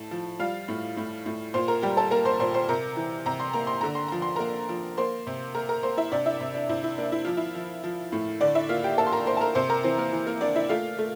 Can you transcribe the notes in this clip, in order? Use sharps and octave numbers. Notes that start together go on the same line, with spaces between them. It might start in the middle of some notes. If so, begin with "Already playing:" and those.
Already playing: A2 A5
F3
G3 F4 F5
A2
A2
A2
A#2 C5 C6
A#4 A#5
G3 G4 G5
A4 A5
A#3 A#4 A#5
C5 C6
A#2 C5 C6
C5 C6
C3 A#4 A#5
E3
C3 A#5
C6
A#3 A#5
C6
D3 A#5
C6
F3 A#5
C6
A#3 A#4 A#5
F3
A#3 C5 C6
C3
A#3 A#4 A#5
A#4 A#5
A#3 C5 C6
E4 E5
C3 D4 D5
E4 E5
C3
D4
C3 E4
E4
A#3 D4
E4
F3 F4
E4
F3
F3
A2
D3 D4 D5
E4 E5
A#3 F4 F5
G4 G5
A#3 A4 A5
C6
A#4 A#5
A#3 C5 C6
A5
A#4 A#5
C3 C5 C6
A#4 A#5
E3 C4 C5
A#3 A#4
E3
A#3 A#4
A#3 D4 D5
E4 E5
A3 F4 F5
A3